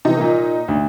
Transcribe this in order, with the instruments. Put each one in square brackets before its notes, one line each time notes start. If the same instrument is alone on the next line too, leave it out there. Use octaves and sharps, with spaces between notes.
[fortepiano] C3 E3 [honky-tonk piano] D#4
[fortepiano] A#2 A#3
D2